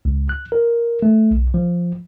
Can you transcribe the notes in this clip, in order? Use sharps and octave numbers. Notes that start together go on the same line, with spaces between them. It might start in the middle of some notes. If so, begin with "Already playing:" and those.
C#2
F#6
A#4
A3
B1
F3